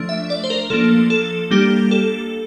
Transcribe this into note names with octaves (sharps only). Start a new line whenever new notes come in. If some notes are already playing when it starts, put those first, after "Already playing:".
Already playing: F3 A3 D4
E5
D5
C5
A#4
F3 A#3 D4 A4
A4
G3 A#3 D4 G4
A4